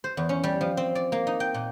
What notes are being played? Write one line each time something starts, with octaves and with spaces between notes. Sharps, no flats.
C5
E2
C#4
G3
F3
C4
D5
A#3
D#4
G5
A#2